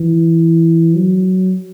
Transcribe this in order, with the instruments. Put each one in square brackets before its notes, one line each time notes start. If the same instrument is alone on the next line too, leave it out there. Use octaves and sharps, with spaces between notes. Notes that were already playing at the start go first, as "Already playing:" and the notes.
Already playing: [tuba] E3
F#3